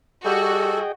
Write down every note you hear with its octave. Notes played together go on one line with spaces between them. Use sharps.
G3 F#4 G#4 A4 D#5 G5